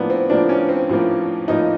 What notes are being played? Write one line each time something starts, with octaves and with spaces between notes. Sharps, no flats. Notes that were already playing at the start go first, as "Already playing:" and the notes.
Already playing: A2 F3 A#3 B3 D4
C4
A2 F3 A#3 D4
C#4
C4
A2 F3 A#3
A2 F3 A#3 D#4